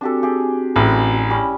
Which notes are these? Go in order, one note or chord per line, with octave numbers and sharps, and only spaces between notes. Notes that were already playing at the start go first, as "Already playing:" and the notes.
C4 D4 F#4 G4 A4 G#5
G4 G#4
A1 D4 E4 G#4
G3 C#4